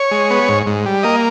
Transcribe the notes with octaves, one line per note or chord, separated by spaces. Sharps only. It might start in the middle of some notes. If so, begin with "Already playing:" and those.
Already playing: C#5
G#3
B3
G#2
G#2
G3
A#3 D#5